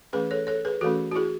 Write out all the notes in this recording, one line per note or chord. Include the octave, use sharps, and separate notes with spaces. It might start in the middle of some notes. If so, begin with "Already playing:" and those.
E3 A3 C#4 G#4 B4
A4 C#5
A4 C#5
G#4 B4
E3 A3 C#4 F#4 A4
F#4
E4 G#4